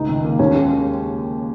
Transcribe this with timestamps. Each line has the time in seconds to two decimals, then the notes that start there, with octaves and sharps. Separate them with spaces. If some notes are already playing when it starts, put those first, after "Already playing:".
Already playing: C#2 D#4
0.09 D#3
0.25 A#3
0.39 D#2 C#4
0.55 G#3